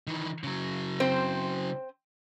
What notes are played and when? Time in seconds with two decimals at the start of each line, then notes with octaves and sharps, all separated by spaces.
0.07 D#3 E3
0.44 C#3 F#3
1.00 C4 C5